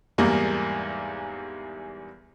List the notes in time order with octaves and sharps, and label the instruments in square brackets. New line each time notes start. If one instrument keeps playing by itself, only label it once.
[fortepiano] E2 G#2 G3 A#3